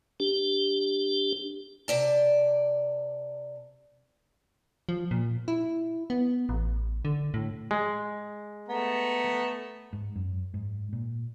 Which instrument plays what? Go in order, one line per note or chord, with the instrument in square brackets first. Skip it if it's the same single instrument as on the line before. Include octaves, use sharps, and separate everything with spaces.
[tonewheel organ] D4 G4
[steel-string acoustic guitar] C3 D5 A5
[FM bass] F3
A#2
E4
B3
A1
D3
A2
[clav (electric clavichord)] G#3
[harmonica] A3 B3 A#5
[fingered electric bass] G#2
F#2
G#2
A#2